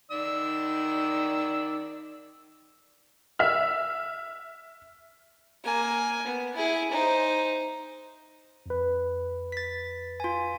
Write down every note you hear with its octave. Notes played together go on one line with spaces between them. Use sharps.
D#3 D5 E6
E5 F6
A#3 G#5
B3
E4 G#4
D#4 C5
F2 B4
A6 B6
F4 G#5